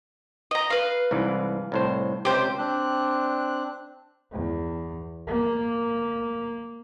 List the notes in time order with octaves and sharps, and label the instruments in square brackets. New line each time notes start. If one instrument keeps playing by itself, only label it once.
[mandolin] D#5 A#5
B4 F5
[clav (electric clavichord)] C2 G#2 E3
C2 A2 C5
[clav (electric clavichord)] C#2 C3 [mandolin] G4 C5
[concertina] C4 D4 F#6
[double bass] E2
A#3